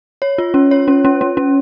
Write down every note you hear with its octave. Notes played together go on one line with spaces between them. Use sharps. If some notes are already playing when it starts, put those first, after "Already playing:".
C#5
F4
C#4
C#5
C#4
C#4
C#4
C#4